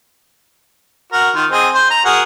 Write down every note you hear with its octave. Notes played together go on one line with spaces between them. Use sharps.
F#4 A#4
D#3 F4
C4 G#4 D#5
C5
A#5
F#4 G#4 A#4